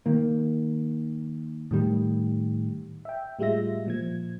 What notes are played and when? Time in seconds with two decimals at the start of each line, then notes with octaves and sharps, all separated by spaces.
0.06 D#3 A#3
1.71 A2 D#3 G3
3.05 E5 G5
3.39 A2 G3 G#3 F4 E5 A#6
3.86 A#2 F3 G#6